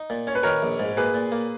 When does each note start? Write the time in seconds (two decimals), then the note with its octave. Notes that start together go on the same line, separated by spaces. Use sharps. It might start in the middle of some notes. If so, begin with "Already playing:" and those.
Already playing: D#4
0.10 A#2
0.27 C#4 C#5
0.35 B4
0.43 D#3 A#4 C#5
0.62 A#1
0.80 G#2
0.97 A#3 G#4 B4
1.14 A#2
1.32 A#3